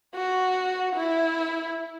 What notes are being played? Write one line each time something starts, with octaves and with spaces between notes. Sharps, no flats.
F#4
E4